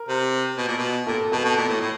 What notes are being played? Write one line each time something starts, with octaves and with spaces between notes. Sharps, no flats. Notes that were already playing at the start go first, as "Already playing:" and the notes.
Already playing: A#4
C3
B2
A#2
B2
A#2 A4 A5
B2 A4 A5
B2
A#2
A2
A2